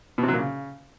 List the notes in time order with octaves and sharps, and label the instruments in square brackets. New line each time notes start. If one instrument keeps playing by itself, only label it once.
[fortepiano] B2
C3
F#3
A#2
C#3